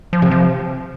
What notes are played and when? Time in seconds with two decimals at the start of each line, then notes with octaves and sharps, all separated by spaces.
0.13 F3
0.22 C3
0.31 F3